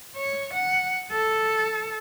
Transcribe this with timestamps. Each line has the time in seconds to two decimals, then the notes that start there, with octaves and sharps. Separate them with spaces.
0.16 C#5
0.53 F#5
1.12 A4